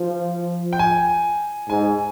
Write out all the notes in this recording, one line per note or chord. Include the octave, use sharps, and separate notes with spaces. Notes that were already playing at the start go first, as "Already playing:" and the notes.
Already playing: F3
G5
G#5
G#2 G#5